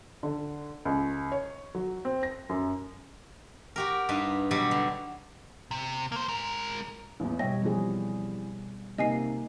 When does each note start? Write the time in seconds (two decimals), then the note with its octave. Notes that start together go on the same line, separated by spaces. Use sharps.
0.23 D3
0.85 C#2
1.32 C#5
1.75 F#3
2.05 C4
2.23 A#6
2.49 F#2
3.76 F#4 G4 A#4
4.09 G2 D#4 B4
4.51 B2 F#3 G3 G4 B5
4.71 D3
5.71 C3
6.12 A#3 C5
6.28 G#3 A#4
7.20 A1 E2
7.39 B2 G3 C#5 D#5 E5 G5 A#6
7.62 E3 F3 G3 C4 G#4
8.98 C3 A#3 D#4 D#5 G#5 C7